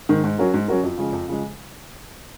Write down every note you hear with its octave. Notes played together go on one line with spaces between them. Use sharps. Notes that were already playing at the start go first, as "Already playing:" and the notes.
G#2 D#3
G#2
F#3 C#4 F#4 A#4
G#2
F#3 C#4 F#4 A#4
F2
C#3 F3 G#3
F2
C#3 F3 G#3